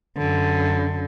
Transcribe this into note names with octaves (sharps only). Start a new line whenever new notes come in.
F#2 D3